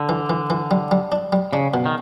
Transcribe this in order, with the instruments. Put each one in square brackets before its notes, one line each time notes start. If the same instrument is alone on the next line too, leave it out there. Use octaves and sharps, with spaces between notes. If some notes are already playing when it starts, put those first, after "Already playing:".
Already playing: [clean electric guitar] D3
[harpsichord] E3
E3
E3
G3
G3
D4
G3
[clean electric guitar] C#3 [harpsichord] D4
[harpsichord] B2
[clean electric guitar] D#3